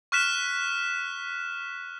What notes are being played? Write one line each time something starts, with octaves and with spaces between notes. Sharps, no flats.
C#6 F6 F#6 B6 E7